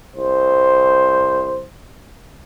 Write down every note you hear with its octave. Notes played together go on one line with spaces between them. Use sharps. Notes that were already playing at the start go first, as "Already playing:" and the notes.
C2 C5